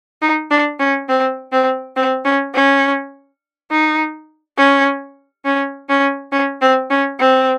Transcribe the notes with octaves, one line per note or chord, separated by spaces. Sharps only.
D#4
D4
C#4
C4
C4
C4
C#4
C#4
D#4
C#4
C#4
C#4
C#4
C4
C#4
C4